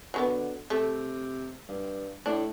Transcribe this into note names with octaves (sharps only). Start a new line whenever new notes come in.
D3 F#3 A3 B3
C3 A3
G2
A2 D4